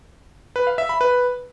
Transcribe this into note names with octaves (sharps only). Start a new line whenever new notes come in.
B4
F5
E5
B5
B4